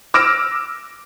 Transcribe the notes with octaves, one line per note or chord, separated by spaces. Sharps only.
D6 E6 F6 A#6 D7 E7